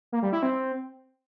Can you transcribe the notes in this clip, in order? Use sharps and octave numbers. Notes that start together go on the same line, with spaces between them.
A#3
G3
E4
C4